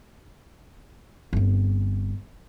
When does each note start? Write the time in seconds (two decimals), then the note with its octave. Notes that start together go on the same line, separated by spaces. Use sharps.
1.33 G1 C4